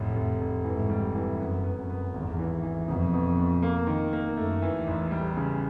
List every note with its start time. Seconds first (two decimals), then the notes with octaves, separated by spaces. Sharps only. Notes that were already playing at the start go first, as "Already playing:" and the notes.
Already playing: F1 A2
0.16 F1
0.41 F1
0.65 G#2 E3
0.90 G3
1.15 E3
1.39 F#2 B3
1.64 B3
1.77 F#2
1.90 B3
2.14 G#1 E2
2.39 E3
2.63 E3
2.88 F2 B2
3.14 B2
3.38 B2
3.63 A#3
3.87 D#3
4.13 A#3
4.37 F#2 A3
4.62 E3
4.74 E2
4.87 A1
5.11 G3
5.36 C#3